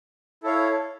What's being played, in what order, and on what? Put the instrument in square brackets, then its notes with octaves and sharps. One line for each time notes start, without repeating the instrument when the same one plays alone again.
[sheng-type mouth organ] E4 A4 C#5 F5